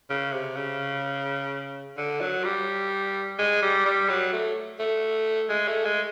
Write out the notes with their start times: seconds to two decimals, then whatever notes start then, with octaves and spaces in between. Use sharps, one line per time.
0.10 C#3
0.33 C3
0.56 C#3
1.97 D3
2.21 F#3
2.44 G3
3.39 G#3
3.62 G3
3.85 G3
4.09 F#3
4.32 A3
4.79 A3
5.49 G#3
5.68 A3
5.85 G#3